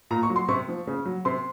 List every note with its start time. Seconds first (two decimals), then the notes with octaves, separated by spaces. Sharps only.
0.11 A#2 A#5
0.23 C#6
0.30 F#3
0.36 C6
0.48 C3 C#6
0.68 F3
0.87 C#3
1.06 F#3
1.25 C3 C6